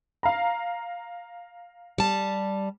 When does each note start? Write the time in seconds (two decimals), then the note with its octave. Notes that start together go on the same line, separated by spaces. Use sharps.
0.23 F5 A#5
1.98 G3 A5